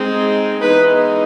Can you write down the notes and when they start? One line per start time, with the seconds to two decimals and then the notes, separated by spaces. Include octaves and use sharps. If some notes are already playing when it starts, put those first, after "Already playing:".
Already playing: G#3 C4 D#4
0.62 E3 G#3 B3 D#4 B4